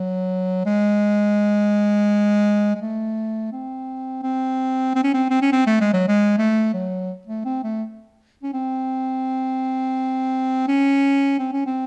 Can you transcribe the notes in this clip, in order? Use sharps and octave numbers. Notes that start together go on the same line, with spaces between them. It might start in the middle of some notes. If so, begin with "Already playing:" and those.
Already playing: F#3
G#3
G#3
A3
C4
C4
C4
C#4
C4
C4
C#4
C4
A3
G#3
F#3
G#3
A3
F#3
A3
C4
A3
C#4
C4
C#4
C4
C#4
C4